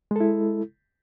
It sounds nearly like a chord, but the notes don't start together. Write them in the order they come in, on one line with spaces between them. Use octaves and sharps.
G#3 A4 E4